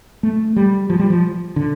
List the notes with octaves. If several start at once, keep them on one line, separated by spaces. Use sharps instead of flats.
A3
G3
F3
G3
F3
D3